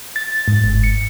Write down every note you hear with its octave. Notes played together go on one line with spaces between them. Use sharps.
A6
G#2
G1
C#7